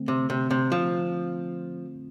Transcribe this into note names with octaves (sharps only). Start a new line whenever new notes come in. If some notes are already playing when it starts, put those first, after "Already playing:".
Already playing: D3 A3 C4
C3
C3
C3
F3